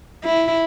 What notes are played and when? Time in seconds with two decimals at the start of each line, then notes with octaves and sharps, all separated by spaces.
0.24 E4